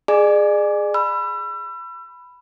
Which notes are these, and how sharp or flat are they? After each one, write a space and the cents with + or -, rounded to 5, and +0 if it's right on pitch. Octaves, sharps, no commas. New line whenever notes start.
G#4 +0 D5 +40 G#5 +0
B5 +0 E6 +35